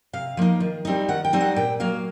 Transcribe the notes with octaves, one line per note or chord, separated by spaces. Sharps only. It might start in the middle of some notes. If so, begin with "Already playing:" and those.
C3 F5
F3 A#3 D#4
D#3
G3 C4 D#4
D#3 F#5
G5
G3 C4 D#4
F#5
A#2 G5
F#3 A#3 F5